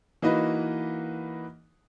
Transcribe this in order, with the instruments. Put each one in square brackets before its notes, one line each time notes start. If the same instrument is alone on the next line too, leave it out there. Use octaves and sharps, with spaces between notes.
[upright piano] E3 A#3 D#4 F#4 B4 D#5